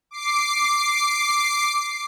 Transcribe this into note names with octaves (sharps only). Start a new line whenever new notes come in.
D6 C7